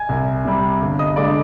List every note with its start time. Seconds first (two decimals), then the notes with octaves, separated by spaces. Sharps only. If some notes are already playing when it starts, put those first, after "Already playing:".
Already playing: G#5 G#6
0.09 C2
0.45 C3 G3
0.81 G1
0.99 D#5 D#6
1.16 G2 D3 G#3 D5 D6